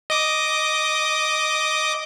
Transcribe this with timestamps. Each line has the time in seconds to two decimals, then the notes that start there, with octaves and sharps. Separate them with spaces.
0.10 D#5 D6 D#6